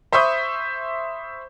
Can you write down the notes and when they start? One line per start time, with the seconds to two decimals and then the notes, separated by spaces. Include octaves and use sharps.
0.13 C5 E5 B5 C#6 D#6 G6